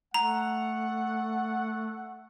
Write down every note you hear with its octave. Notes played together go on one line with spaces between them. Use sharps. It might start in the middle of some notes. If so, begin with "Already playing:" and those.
A3 F#5 A#5